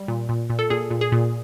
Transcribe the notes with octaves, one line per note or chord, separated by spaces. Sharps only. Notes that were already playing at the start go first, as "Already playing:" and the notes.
Already playing: G3
A#2
A#2
A#2
A4
A#2 G#4
A#2
G#4
A#2